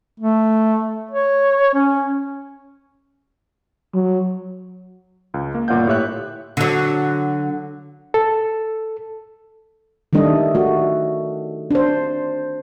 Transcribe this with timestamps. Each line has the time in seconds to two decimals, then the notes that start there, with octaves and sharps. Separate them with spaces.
0.20 A3
1.11 C#5
1.74 C#4
3.94 F#3
5.34 C#2
5.55 A#3
5.68 G1 A#2 D5 F5 F#5 G6
5.87 A2 G4 C#5 E5 F#6
6.57 D3 F#3
8.14 A4
10.13 D#3 G3 A3 D4 D#5
10.55 A3 F#4
11.71 D4 C5